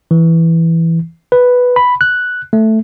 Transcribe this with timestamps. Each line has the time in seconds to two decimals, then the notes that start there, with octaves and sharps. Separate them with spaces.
0.11 E3
1.32 B4
1.76 B5
2.01 F#6
2.53 A3